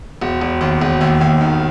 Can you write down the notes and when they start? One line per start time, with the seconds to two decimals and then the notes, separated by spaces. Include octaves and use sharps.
0.21 E1
0.41 E1
0.61 D#2
0.81 E1
1.01 D#2
1.21 D#2
1.41 D#3